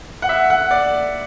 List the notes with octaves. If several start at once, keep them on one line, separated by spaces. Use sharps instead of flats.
F#5
E5
F#5
D5